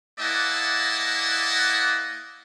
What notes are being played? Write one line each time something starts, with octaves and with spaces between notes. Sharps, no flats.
A#3 E4 D5 D#5 F#5 A5